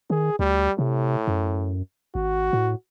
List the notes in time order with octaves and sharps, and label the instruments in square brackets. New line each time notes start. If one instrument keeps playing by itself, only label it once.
[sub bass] D#3 [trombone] G#4
[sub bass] D2 [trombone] G3
[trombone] A2 [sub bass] C3
[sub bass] F#2
[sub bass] G#1 [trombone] F#4
[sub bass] A2